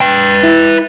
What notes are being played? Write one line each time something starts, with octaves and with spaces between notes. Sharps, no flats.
B4 G5
E4